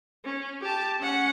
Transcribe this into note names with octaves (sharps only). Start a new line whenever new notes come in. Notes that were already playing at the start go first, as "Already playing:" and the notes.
C#4
G4 A5
C#4 F#5